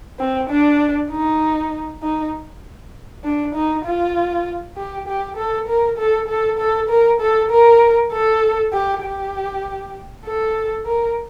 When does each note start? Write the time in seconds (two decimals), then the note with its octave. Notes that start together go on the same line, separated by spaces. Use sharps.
0.19 C4
0.50 D4
1.11 D#4
2.03 D#4
3.24 D4
3.55 D#4
3.85 F4
4.77 G4
5.07 G4
5.37 A4
5.68 A#4
5.98 A4
6.28 A4
6.59 A4
6.89 A#4
7.21 A4
7.51 A#4
8.12 A4
8.73 G4
9.03 G4
10.26 A4
10.86 A#4